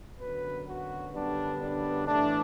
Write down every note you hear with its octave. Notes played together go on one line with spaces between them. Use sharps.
F#2 D3 F#3 B3 B4
F#4
F#2 D3 G3 B3 D4
D4
A2 E3 A3 D4